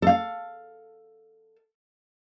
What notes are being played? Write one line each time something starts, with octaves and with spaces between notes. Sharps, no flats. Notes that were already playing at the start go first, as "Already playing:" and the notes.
A4 F5